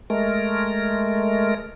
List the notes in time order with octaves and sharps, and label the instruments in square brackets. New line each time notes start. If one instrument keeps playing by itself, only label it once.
[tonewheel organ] G#3 A3 A#4